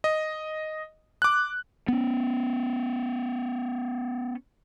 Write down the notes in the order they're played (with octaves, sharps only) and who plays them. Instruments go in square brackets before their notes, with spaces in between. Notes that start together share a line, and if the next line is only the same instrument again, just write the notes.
[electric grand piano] D#5
D6 F#6
[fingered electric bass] B3 C#4